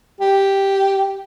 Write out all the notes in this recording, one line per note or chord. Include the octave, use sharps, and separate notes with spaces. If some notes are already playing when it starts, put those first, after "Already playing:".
G4